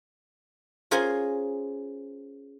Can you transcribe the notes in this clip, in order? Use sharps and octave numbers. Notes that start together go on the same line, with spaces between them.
C#4 F4 G#4 A#4 C5 G#5